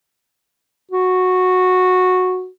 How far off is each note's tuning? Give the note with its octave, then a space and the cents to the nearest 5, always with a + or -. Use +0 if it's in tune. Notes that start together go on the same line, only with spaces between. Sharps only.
F#4 -10